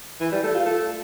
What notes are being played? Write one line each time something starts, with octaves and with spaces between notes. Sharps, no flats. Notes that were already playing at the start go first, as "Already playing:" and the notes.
E3
G3
A3
F4
A3